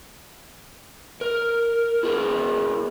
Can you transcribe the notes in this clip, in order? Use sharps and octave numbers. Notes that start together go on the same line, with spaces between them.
A#4
E4 G#4 A#4